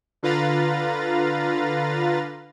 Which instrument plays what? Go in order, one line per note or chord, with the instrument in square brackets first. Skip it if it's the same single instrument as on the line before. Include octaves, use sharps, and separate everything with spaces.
[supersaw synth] D3 F4 B4 F5 A#5 A6